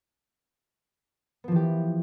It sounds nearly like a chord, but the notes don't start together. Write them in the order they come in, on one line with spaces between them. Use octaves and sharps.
B3 F3 E3 G4